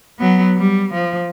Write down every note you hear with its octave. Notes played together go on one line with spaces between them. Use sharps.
F#3 B3
G3
F3